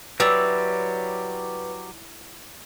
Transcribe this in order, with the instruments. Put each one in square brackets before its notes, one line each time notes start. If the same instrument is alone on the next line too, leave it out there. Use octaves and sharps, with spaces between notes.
[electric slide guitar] F#3 G4 D5 [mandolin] E4 C#5 E6 [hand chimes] B4